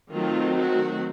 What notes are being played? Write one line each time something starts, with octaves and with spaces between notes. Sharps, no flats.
D#3 F#3 A3 C4 F4
F#4